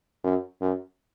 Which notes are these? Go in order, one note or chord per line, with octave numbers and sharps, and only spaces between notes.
F#2
F#2